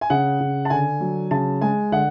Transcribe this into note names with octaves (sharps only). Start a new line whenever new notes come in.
G#5
C#3 F#5
C#3
A5
D3 G#5
F#3
C#3 A5
G#3 G#5
D3 F#5